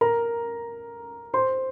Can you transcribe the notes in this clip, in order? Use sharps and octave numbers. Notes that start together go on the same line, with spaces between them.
A#4 A#5
C5 C6